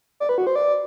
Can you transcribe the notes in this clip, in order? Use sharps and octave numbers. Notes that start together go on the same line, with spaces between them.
D5
B4
F#4
C5
D5